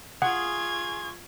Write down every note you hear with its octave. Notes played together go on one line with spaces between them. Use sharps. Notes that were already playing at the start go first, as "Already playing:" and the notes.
F4 G#4 F#5 C6 C#6 G#6